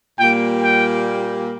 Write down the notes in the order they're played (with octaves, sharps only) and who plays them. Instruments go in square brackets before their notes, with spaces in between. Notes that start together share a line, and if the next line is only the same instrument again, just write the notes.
[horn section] A#2 G3 A#3 G5
G5